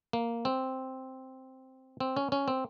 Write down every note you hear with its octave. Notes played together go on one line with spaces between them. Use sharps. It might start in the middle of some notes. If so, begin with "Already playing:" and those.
A#3
C4
C4
C#4
C#4
C4